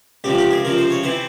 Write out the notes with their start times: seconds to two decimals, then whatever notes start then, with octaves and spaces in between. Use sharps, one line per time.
0.24 C#2 C3 F3 G4
0.38 G4
0.51 G#4
0.65 C#2 C3 F3 A#4
0.78 C5
0.90 C#5
1.03 C3 E3 C5